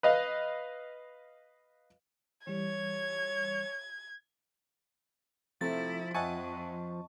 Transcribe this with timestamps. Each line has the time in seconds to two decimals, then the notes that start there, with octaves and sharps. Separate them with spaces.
0.03 B4 D#5 F5
2.47 E3 G3 C#5 G#6
5.61 C3 F3 A3 E4 A6
6.14 F2 D#5 E5 F#5 G#5 A5 C#6